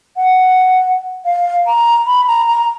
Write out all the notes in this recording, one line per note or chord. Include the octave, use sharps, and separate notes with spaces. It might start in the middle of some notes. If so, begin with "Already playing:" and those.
F#5
F5
A#5
B5
A#5
A#5